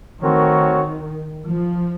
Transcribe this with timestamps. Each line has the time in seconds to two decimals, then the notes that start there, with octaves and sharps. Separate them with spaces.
0.21 D#3 A3 C4 F#4 A#4 C#5
1.48 F3